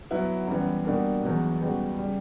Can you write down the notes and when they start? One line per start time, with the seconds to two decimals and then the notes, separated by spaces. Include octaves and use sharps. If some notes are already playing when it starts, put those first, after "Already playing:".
0.11 F#3 B3 E4
0.47 F#2 E3 G3 B3
0.85 B2 G3 A#3 D4
1.23 E2 B2 F#3
1.61 C#2 B2 G3 B3 F#4
1.97 C#3 G3